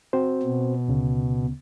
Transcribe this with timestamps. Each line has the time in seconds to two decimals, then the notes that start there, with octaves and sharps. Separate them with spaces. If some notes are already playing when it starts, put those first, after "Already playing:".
0.13 C4 F#4 C5
0.42 B2
0.88 D2 C#3